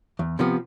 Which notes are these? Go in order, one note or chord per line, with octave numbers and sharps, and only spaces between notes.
E2
C3 F3 B3